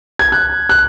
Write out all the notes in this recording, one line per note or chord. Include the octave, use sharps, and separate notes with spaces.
G#6
F#6
F#6